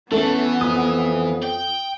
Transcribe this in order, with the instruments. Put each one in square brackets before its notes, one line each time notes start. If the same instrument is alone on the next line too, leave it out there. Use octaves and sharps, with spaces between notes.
[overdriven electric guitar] E3 [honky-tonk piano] A3 A4 [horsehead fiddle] B3 [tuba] C#4
[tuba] F2 [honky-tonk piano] D#6
[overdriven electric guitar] G5